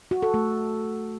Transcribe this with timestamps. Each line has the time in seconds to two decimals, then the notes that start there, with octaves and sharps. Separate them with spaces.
0.11 F#4
0.23 A4
0.34 A3